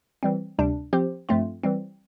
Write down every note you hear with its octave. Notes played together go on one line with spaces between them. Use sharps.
E3 G3 C4
D2 C3 G3 D4
F3 C4 G4 C5
G2 F3 A3 C4 F4
E3 G3 C4